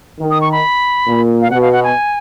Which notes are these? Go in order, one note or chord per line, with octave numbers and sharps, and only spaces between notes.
D#3
D#6
C#6
B5
A#2
F5
B2 F#5
F5
F#5
G#5